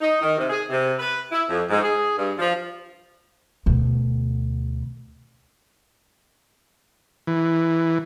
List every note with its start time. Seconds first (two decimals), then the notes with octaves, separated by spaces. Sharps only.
0.01 D#4
0.22 D#3
0.37 C3
0.50 G#4
0.69 C3
0.99 B4
1.32 E4
1.49 F2
1.70 G#2
1.82 G#4
2.16 G2
2.38 F3
3.66 D2 B2
7.27 E3